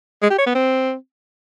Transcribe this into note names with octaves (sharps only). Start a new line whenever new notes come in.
G#3
G4
C#5
B3
C4